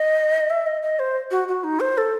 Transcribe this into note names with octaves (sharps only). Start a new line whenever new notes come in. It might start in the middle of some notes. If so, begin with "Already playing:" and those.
Already playing: D#5
E5
D#5
D#5
C5
F#4
F#4
D#4
C5
A4